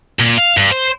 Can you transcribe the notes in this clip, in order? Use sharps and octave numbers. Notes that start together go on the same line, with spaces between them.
A#2
F5
G2
C5